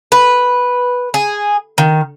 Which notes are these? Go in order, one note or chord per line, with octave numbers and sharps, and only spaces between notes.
B4
G#4
D#3